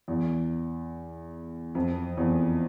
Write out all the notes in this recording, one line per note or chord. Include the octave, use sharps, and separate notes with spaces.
E2
F2
E2